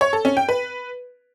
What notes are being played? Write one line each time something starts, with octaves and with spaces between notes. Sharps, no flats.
C#5
A4
C#4
G5
B4